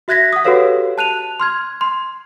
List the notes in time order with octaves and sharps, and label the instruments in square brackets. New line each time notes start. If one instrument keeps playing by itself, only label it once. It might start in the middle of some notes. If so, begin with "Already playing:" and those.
[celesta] F#4 E5 F#6 G#6 A#6 B6
F#5 D#6
F#4 G4 A4 B4 C#5 F5
A5 F#6 D#7 F7
C6 F6 G#6
C6